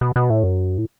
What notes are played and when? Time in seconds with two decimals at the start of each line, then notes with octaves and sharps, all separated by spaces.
0.01 B2
0.16 B2
0.30 A2
0.43 F#2
0.78 A2